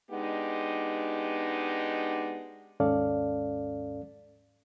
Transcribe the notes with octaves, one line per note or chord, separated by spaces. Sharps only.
G#3 B3 D4 D#4 G4
D#2 G#2 C#4 A4 D5 F5